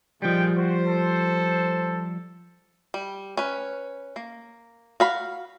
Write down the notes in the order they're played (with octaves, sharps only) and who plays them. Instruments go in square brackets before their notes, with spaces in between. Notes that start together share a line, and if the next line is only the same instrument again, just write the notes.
[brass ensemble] A#2 D#3 G#3 [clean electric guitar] F3 G3 [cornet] G5
[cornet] F#4 [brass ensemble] C5
[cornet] A4
[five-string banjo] G3
C#4 B4
A#3
F#4 F5 B5